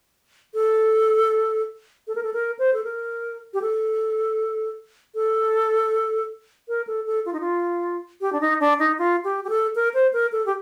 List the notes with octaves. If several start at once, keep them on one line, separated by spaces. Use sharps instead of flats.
A4
A4
A#4
A4
A#4
C5
A4
A#4
G4
A4
A4
A#4
A4
A4
F4
D#4
F4
G4
D4
D#4
D4
D#4
F4
G4
G4
A4
A#4
C5
A#4
A4
G4